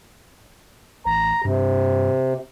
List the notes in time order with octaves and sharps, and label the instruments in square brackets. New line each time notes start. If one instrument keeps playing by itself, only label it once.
[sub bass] A1 [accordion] A#5
[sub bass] G2 [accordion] C3